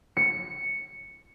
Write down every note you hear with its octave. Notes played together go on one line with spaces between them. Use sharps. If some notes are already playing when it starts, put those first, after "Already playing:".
C#7